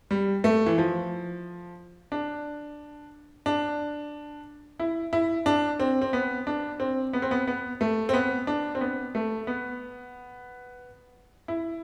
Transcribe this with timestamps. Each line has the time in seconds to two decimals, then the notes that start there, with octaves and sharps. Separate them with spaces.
0.11 G3
0.44 A3
0.66 E3
0.78 F3
2.12 D4
3.46 D4
4.80 E4
5.13 E4
5.46 D4
5.80 C4
6.02 C4
6.13 B3
6.47 D4
6.80 C4
7.13 B3
7.22 C4
7.31 B3
7.47 B3
7.81 A3
8.09 C4
8.14 B3
8.47 D4
8.75 C4
8.81 B3
9.15 A3
9.47 B3
11.48 E4